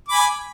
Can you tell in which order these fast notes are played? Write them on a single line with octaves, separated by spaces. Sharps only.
D6 B5 G#5